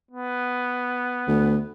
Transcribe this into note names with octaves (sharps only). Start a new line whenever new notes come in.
B3
D2